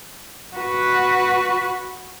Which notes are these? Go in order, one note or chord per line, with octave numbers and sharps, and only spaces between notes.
F#4 B4